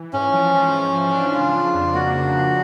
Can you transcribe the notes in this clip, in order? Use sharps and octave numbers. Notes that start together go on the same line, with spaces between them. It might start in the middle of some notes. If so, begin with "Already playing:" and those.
Already playing: E3
G#2 C#4
F3
F3
G#2
F3
D4
C#3 F4
F3
F2
A#3 F#4
C#3
C#3